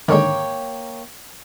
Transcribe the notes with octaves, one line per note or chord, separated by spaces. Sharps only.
G#2 D3 D#3 A#3 C#5 G5